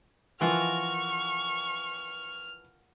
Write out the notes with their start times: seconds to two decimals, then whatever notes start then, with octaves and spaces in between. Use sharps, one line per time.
0.41 E3 F3 F4 F#4 A#4 C#6 F6